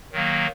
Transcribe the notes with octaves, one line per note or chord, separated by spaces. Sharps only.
D#3 F#3 A#3